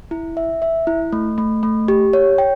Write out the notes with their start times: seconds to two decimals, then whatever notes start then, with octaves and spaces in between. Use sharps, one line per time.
0.11 E4
0.37 E5
0.62 E5
0.87 E4
1.13 A3
1.38 A3
1.63 A3
1.88 G4
2.13 C#5
2.38 G5